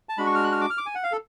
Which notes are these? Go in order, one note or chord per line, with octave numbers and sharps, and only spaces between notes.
A5
G#3 D4 F#4 B5
C#6
F6
F#6
F6
D6
F6
D6
G#5
F#5
F5
A4